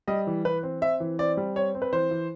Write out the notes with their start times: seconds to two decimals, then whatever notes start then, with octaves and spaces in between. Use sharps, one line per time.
0.08 G3 D#5
0.27 E3
0.45 E3 B4
0.63 C4
0.81 C4 E5
1.00 E3
1.19 C4 D5
1.37 G3
1.56 C4 C#5
1.75 C4
1.82 B4
1.93 E3 C5
2.11 E3